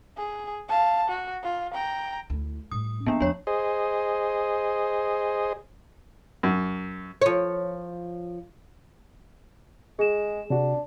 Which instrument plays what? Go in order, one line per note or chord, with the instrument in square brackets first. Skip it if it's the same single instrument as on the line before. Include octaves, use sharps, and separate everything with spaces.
[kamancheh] G#4
F5 A5
F#4
F4
G5 A#5
[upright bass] D2 E4
[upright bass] A2 G3 [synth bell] D#6
[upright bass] C#3 E3 [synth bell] A#3 B3 D4
[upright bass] E2 F3 [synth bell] D4 C#5
[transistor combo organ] G#4 C5 D#5
[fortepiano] F#2
[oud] F3 C#5
[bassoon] G#3 [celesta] G#4 E7
[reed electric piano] C3 F#4 [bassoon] D4